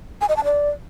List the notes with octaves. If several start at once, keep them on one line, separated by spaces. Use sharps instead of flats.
G#5
D#5
A5
D5